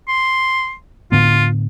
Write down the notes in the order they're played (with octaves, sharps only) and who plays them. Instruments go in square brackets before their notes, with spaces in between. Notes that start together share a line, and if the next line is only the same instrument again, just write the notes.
[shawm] C6
[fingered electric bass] A2 D3 B3 [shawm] F4